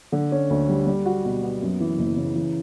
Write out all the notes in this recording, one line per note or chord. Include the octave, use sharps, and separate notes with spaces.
D3
C#4
D2
G3
G3
F#4
B2
B3
F#2
E3
F#1
C#3
E3